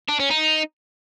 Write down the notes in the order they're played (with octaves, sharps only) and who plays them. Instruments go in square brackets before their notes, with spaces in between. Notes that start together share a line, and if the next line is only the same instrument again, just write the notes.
[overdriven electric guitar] D4
C#4
D#4